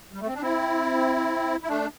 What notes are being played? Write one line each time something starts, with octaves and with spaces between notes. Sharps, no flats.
G3
A3
C4
D4
C4 E4
E4
A3 D4